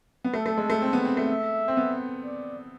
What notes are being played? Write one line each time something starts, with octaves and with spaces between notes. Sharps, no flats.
B3
A3 A4
A3
G#3
A3
C4
B3
C4
A3
E5
C4
B3
D5